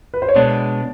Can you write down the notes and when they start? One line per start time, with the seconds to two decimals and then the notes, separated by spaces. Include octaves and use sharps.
0.14 B4
0.22 C5
0.29 C#5
0.35 B2 G#3 B3 D4 D5